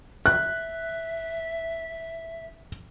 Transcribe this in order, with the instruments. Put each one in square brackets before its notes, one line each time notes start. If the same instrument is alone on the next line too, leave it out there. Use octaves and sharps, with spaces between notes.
[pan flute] E5 [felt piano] F#6